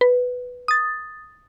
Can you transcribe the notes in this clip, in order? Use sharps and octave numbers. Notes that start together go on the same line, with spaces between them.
B4
D#6 A6